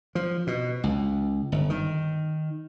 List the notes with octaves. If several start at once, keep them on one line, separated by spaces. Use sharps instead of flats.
F3
B2
C#2
G1
D#3